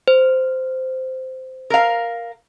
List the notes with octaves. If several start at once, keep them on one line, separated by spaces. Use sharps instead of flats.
C5
A#4 F5